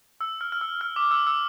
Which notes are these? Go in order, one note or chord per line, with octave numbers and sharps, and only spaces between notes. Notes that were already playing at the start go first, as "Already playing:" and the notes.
E6
F6
F6
E6
F6
D6
E6
E6